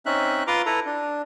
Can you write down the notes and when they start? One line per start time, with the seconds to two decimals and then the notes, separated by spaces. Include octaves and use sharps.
0.06 C4 C#4 D#4 E5 F#6
0.47 F4 B4 A#5 C6 D6
0.66 E4 A4 B4 A#5
0.86 D4